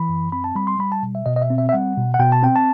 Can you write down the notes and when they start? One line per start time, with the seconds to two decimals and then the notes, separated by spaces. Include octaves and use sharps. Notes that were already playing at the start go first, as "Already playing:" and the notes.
Already playing: E3 B5
0.09 F#2
0.32 C4 B5
0.44 A5
0.55 G3 B5
0.67 C6
0.79 G3 B5
0.92 A5
1.03 B2
1.15 E5
1.26 B2 D#5
1.36 D#5
1.42 E5
1.50 C4
1.58 E5
1.69 E5
1.73 G3 F#5
1.97 B2
2.14 F#5
2.19 B2 G5
2.32 A5
2.43 C4 G5
2.56 A5